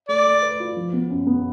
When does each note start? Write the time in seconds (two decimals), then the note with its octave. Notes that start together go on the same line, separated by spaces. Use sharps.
0.09 A3 D5
0.26 A3
0.42 B4
0.60 F4
0.76 F3
0.93 B3
1.10 F#2
1.27 B3